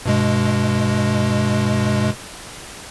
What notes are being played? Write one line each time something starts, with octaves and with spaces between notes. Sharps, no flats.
G2 B2 G#3